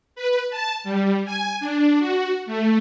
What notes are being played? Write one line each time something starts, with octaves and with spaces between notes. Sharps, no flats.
B4
A5
G3
G#5
D4
F#4
A3